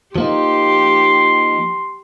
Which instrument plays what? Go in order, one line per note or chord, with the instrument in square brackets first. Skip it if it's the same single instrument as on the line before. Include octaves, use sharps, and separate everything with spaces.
[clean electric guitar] F3 A#3 D#4 [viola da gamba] G4 [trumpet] C6